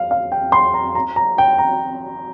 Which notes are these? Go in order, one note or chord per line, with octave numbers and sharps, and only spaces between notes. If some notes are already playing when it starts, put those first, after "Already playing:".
Already playing: F5
F5
G5
C6
A#5
A#5
A#5
G5
A#5